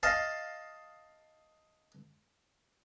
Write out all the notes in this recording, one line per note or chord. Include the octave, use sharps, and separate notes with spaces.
D#5 F5 A5